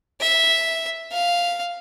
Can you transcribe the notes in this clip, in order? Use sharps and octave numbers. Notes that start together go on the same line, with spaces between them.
E5
F5